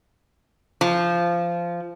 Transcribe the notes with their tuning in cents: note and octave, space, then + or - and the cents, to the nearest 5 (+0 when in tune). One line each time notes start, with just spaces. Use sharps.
F3 -15